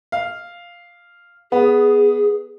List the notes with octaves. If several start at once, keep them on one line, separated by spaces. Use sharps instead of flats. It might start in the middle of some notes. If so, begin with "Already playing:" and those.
F5
B3 G#4